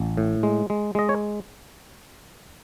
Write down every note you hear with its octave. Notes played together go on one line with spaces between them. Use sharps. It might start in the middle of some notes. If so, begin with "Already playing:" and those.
Already playing: A1
A2
G#3
G#3
G#3 D#5
C#5